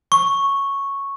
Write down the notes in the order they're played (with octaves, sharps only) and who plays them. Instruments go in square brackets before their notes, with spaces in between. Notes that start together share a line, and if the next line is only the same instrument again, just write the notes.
[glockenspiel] C#6